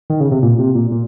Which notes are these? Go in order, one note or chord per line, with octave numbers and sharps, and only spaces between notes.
D#3
C#3
C3
A#2
C3
A#2
A#2